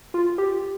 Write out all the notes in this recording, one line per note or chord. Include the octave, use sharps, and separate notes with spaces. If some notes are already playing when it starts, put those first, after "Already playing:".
F4
G4